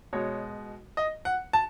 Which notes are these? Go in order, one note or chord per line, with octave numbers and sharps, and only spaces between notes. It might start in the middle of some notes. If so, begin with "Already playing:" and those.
B2 G#3 C#5
D#5
F#5
A5